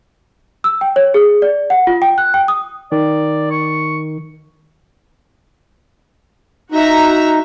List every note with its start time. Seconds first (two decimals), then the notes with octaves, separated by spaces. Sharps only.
0.64 E6
0.81 G5
0.96 C#5
1.14 G#4
1.42 D5
1.70 F#5
1.87 F4
2.02 G5
2.18 F#6
2.34 G5
2.48 D#6
2.92 D#3 D5
3.51 C#6
6.72 D#4 F#4 E5 A#5